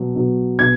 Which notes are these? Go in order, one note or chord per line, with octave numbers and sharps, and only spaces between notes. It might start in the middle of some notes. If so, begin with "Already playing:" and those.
Already playing: B2 F#3
B2 F#3
B2 G#6